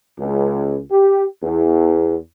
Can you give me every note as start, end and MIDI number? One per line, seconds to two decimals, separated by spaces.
0.19 0.77 37
0.90 1.23 67
1.42 2.15 40